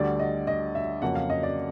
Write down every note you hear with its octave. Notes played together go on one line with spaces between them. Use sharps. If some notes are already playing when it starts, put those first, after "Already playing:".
Already playing: D2 D3 G3 D5
D#5
D#5
E5
F2 C#3 F#3 A#3 C#4 F#5
F5
D#5
D5